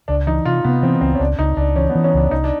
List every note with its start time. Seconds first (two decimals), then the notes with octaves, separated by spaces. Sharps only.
0.08 C#2 D4
0.27 E3 D#4
0.45 C3 F4
0.64 C3 B3
0.82 E3 C4
1.01 C#2 C4
1.15 C#4
1.20 C#2 D4
1.38 C#2 D#4
1.57 C#2 D4
1.75 E3 C#4
1.90 B3
1.95 E3
2.04 C#4
2.14 C#2 D4
2.31 C2 D#4
2.44 D4